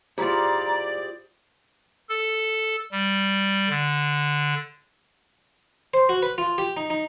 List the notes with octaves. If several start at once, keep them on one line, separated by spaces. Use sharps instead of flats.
E4 F4 G4 G#4 C5 D5 A#5
A4
G3
D3
C5
F#4
B4
F4
G4
D#4
D#4